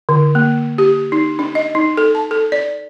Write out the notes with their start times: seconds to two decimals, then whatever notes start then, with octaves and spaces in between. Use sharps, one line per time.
0.09 D3
0.35 A#3
0.78 G4
1.12 D#4
1.39 D4
1.55 D#5
1.75 D#4
1.97 A4
2.15 A5
2.31 A4
2.52 D5